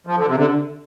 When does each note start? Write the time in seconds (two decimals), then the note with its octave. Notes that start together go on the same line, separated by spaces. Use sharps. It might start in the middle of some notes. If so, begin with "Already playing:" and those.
0.07 F3
0.17 D3
0.27 C3
0.37 D3